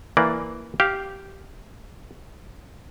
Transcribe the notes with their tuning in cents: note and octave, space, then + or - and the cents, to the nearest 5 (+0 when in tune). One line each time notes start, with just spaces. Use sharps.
E3 +0 A#3 +0 D5 +0
G4 -10 F5 +0